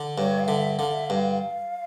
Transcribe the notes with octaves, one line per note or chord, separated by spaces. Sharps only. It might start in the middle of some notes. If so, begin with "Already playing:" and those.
Already playing: D3
G2 C#5
F5
D3 E5
D3 F5
E5
G2 F5